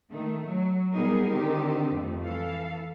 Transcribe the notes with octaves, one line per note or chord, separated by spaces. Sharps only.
D#3 A3
F#3
A#2 G3 B3 D#4 G#4 A#4
D3 D#3 C4 G4
F2 A3
E3 A4 F5